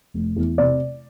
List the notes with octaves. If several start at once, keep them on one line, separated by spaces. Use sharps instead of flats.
F1
E2
C3 D5